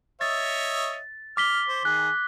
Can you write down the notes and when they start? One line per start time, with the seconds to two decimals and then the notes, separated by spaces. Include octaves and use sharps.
0.21 C#5 D#5 E5 A6
1.37 D6 F6 B6 G7
1.68 C5
1.85 D#3 G#4 F#6